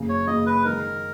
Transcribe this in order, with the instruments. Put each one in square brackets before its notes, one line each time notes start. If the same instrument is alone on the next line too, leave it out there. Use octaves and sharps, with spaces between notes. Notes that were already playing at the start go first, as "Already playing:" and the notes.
Already playing: [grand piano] F#1 F#2 C#3
[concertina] C#5
[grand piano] F#1 F#2 C#3 [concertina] D#5
[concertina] B4
[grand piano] D#3 G#3 D#4 [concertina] A#4